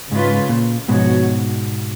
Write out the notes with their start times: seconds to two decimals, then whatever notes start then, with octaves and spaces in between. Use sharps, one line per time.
0.11 G#2 C#3 G#3 C#4 F4 B4
0.49 A#2
0.88 G#2 B2 F3 B3 F#4 C#5